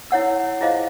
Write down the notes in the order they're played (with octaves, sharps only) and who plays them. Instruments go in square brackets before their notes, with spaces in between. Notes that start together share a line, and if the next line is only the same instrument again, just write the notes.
[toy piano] E4 C#5 F#5 E6
E4 F4 G#4 C5 D#5 F5